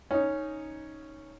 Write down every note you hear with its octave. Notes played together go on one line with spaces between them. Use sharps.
C#4 D#4